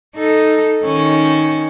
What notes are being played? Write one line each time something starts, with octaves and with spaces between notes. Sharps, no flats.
D#4 A4
D#3 C#4